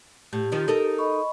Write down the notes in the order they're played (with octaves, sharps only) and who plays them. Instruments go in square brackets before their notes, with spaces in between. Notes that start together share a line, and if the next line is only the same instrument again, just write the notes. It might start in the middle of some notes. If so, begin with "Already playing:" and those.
[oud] A2 [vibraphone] G4
[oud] D#3 F3 D#4
D#4 A4 A#4
[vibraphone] D#5 B5 C#6